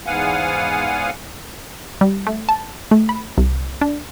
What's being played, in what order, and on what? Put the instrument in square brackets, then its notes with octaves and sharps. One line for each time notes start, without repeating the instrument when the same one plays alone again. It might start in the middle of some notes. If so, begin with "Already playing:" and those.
[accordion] E2 G#2 B3 F5 F#5 G#5
[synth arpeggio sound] G3
A3
A5
A3
B5
C2
D4